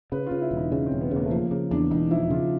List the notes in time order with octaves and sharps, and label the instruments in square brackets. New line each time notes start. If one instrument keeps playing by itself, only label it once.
[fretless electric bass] C#3 [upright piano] B4
[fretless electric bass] C#3 [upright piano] F4
[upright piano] E4
[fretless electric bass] E1
[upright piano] D#4
[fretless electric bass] C#3 [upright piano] C#4
[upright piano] C4
[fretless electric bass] E1
[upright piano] B3
[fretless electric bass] C#3 [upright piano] A#3
[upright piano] A3
[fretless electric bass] F3 [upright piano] A#3
[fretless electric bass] C#3 [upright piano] A#3
[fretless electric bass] E2 [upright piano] D4
[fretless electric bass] E1 [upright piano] D#4
[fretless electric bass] F3 [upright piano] E4
[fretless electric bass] C#3 [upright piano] F4